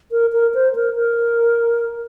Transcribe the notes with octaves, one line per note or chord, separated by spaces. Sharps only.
A#4
A#4
C5
A#4
A#4